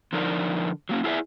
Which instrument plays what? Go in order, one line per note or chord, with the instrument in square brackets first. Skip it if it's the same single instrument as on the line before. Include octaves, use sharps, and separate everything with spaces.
[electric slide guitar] D3 F3 D#4 A#4 D5
F#3 A#3 C#4
E4 F4 G#4 C5 D5 E5